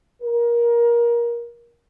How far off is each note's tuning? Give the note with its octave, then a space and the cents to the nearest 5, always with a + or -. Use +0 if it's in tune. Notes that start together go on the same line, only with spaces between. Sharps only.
A#4 +20